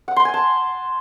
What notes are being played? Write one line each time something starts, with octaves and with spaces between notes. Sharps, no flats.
F#5
C6
G#5
A5